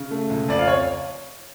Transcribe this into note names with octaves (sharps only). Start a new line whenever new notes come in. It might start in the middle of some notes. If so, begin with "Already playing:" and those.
Already playing: C#3
A3
C#2
F2 D5
F5
C#5